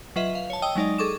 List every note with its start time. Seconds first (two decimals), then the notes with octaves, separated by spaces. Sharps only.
0.16 F#3 F4 B4 D#5 E5
0.35 F5
0.50 C#5 A5
0.62 D#5 G5 D#6 E6
0.75 F#3 G#3 D#4 D5 D#5
0.98 G#4 A4 C#6 D6 E7